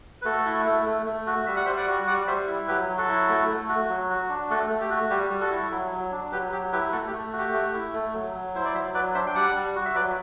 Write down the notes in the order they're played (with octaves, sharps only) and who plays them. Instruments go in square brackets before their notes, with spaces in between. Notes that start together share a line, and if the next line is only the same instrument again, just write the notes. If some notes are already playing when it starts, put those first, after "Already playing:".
[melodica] B4
A3 F#4 A4
E4
A3
A3
A3
F#4
G3 E5
F#5
G3 C5 E5
D5 F#5
F#4
G3 D5 F#5
D5
G3 C5 E5
E4
F#3 G4 B4
F#3
F#4 A4
E4
A3
A3
F#4
F#3
F#4
D4
A3 F#4 A4
A3
G4
F#4
G3 G4
G3
F#4 A4
E4
F#3
F#3
D4
F#3 G4 B4
F#3 G4
E4 G4 B4
A3 F#4 A4
G4
A3
F#4
G4
A3
E4
A3
F#3
F#3
E4 C5
D5
F#3 C5 E5
F#3 B4 D5
D4 C5 E5
G5
G3 D5 F#5
G3
F#4
E5
F#3 B4 D5